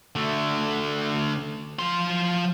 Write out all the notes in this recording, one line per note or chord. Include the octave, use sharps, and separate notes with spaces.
D3 A3
F3 C6